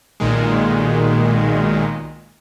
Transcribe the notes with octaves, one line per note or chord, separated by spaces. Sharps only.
B1 A#2 D#3 G#3